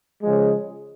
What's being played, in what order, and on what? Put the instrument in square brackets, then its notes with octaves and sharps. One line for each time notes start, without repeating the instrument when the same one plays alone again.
[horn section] C#3 F3 G#3